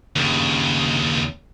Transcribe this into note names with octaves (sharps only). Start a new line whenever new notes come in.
D#2 C#3